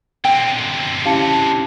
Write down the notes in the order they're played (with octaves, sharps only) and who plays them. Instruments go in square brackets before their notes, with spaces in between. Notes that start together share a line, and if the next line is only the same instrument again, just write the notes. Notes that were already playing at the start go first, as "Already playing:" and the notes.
[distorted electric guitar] D3 C4 [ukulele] G5
[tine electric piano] C#4 E4 G4 [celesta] F5 A5 C#7